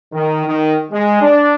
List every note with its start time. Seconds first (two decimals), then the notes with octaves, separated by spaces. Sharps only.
0.13 D#3
0.46 D#3
0.91 G#3
1.22 D4